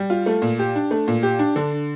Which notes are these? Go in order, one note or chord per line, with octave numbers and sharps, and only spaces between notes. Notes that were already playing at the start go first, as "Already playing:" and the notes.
Already playing: G3
F4
A3
A#2
G4
D4
A3
A#2
G4
D4
D3